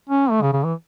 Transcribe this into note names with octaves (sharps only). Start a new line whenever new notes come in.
C#4
A3
C#3
C#3
E3